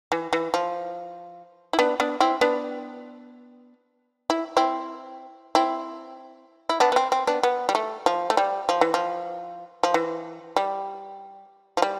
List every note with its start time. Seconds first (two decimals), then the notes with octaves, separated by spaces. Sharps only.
0.12 E3
0.33 E3
0.54 F3
1.73 E4
1.79 B3 D4
2.00 B3 D4
2.20 C4 E4
2.41 B3 D4
4.30 E4
4.57 C4 E4
5.55 C4 E4
6.69 E4
6.80 B3 D4
6.92 B3
6.96 C4
7.12 C4
7.27 B3 D4
7.43 B3
7.69 G3
7.75 A3
8.06 F3
8.30 A3
8.37 G3
8.69 F3
8.81 E3
8.94 F3
9.83 F3
9.94 E3
10.56 G3
11.77 F3
11.82 G3